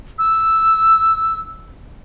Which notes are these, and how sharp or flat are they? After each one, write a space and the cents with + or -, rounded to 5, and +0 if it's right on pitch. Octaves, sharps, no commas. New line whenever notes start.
E6 -5